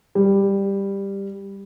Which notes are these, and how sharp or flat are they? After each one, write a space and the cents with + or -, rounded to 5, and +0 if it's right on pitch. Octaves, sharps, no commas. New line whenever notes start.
G3 +10